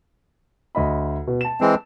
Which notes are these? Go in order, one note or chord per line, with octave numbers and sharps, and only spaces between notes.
D2 D#5 B5
B2
A5 E7
E3 G#3 C4